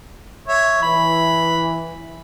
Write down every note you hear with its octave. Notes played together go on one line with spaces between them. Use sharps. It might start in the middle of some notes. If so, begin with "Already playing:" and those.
C#5 E5
E3 B5